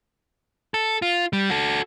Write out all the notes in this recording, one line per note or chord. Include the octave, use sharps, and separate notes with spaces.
A4
F4
G3
F#4 A4